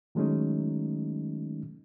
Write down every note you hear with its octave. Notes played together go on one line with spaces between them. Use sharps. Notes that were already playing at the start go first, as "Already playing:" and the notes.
D#3 F#3 G#3 A3 C#4 D#4